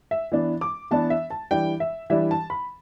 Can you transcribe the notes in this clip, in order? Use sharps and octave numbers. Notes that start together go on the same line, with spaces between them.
E5
E3 B3 D4
D6
E3 B3 D4 A5
E5
A5
E3 G3 D4 G5
E5
E3 G3 D4 E5
A5
B5